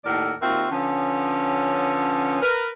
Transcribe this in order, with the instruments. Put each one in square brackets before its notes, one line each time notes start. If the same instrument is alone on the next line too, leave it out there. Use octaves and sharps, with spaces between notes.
[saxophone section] D#2 A2 A4 A#4 D5 F#5
D#2 C4 F4 F#4 A#4 E5
D3 F3 B3 C#4
A#4 B4